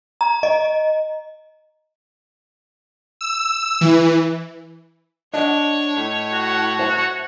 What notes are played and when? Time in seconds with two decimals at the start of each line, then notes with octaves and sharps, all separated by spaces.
0.21 A#5
0.43 D#5
3.21 E6
3.81 E3
5.34 D4 C#5 D#5 F#5
5.96 A2
6.33 F#4
6.79 C5 E5 A5